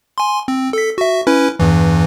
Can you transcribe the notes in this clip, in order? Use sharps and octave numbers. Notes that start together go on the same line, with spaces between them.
G#5 C6
C4
A4 B6
F#4 E5
C#4 E4 B4
E2 G2 E3